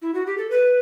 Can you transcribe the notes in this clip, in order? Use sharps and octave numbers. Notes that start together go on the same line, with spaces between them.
E4
F#4
G4
A4
B4